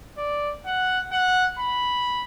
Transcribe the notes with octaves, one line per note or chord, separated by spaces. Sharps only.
D5
F#5
F#5
B5